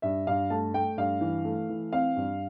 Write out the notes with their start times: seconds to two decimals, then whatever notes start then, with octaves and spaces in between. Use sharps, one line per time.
0.02 G2 E5
0.27 G2 F5
0.50 A3 A5
0.74 A3 G5
0.97 G2 F5
1.21 E3
1.45 A3
1.69 E3
1.93 C4 F5
2.16 G2